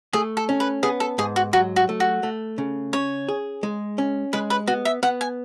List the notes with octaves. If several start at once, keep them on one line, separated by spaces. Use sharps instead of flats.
A3 G#4
A4
C#4
B4
B3 G#4
A4
G#2 G#4
F#4
F#3 F#4
F#4
A3
F#4
A3
C#3
C#4 C#5
G#4
G#3
C#4
G#3 B4
B4
B3 F#4
E5
B3 F#5
G#5